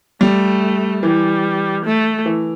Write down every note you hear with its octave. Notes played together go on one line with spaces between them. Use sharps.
G3 A3
E3 G3
A3
E3